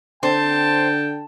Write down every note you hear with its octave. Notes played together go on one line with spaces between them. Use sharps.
D3 C4 G5 A5